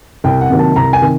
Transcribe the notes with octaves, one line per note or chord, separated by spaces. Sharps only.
C2 G5
F#5
C3 D#3 F#3 A#3
A5
C2 A#5
G#5
C3 D#3